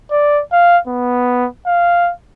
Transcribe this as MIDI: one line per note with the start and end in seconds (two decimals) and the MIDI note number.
0.11 0.42 74
0.52 0.79 77
0.88 1.47 59
1.66 2.12 77